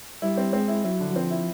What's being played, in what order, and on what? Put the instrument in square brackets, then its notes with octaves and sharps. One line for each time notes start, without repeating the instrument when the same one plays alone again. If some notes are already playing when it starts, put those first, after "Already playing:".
[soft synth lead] G3 [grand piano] E4
[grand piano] C4
[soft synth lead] G#3 [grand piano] C4
[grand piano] E4
[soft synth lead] F#3 [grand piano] E4
[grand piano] D3
[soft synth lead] F#3
[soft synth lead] F3 [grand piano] C4
[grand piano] E4